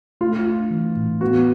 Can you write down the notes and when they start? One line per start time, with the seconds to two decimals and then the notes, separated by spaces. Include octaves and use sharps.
0.21 A3 F4
0.45 D4
0.71 E3
0.96 A2
1.21 B3 F#4